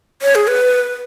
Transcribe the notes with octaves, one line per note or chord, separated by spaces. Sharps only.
C#5
G#4
B4